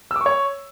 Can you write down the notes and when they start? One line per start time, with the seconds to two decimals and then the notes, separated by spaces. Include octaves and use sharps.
0.11 E6
0.16 D6
0.21 C#6
0.26 C#5